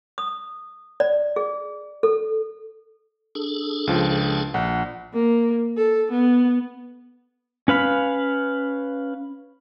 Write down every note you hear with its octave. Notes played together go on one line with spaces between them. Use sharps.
D#6
D5
G#4
A4
D4 G#4 A4
C#2 F3
A#1 F#5
A#3
A4
B3
C#4 B4 F5 B5